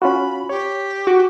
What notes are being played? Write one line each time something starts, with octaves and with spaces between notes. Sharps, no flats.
C#4 F4 F#4 B5
G4 C#5
F#4 D6